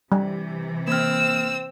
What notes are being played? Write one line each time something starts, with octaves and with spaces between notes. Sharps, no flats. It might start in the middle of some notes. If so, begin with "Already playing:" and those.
C3 E3 G3
A#3 C4 E6 F6